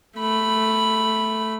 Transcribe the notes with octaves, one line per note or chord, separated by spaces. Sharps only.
A3 B5